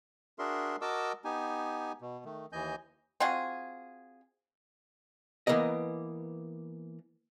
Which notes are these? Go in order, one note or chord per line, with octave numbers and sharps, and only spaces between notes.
D4 F#4 G#4 A#4 E5 C6
F#4 A#4 D#5 A5 D6 E6
B3 D#4 G4 G#5
B2
D#3 A3
D#2 E3 D#5 G#5 G6
C4 F4 F#4 G#4
E3 A#3 B3 A#4 D#5